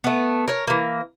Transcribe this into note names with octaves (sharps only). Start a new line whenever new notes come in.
A3 B3
A#4 C#5
E3 A#3